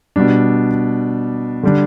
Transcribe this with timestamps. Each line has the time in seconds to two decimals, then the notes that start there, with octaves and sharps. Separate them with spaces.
0.16 B2 G3 D4
1.63 D3 G3 D4